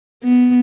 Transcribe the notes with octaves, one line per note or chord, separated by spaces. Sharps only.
B3